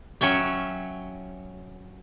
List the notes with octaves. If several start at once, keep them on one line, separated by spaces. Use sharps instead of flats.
F#3 C#4 E5 G5